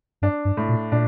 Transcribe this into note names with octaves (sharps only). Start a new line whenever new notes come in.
G2 D4
G2
A2
A#2
A#2 D4